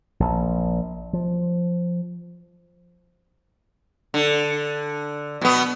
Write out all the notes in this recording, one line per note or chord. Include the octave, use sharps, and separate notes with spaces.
A#1
F3
D3
B2 B3